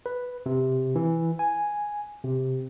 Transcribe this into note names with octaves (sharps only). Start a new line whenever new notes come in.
B4
C3
E3
G#5
C3